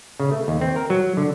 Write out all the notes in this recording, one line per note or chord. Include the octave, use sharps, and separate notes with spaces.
C#3
A3
D#2
C4
A#4
F#3
D3